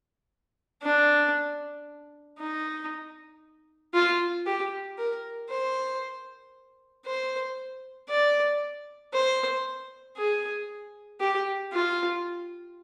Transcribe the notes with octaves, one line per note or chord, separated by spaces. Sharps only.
D4
D#4
F4
G4
A#4
C5
C5
D5
C5
G#4
G4
F4